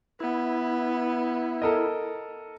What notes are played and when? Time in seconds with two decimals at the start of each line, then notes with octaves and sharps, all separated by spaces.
0.20 B3 E4
1.62 A4 A#4 D#5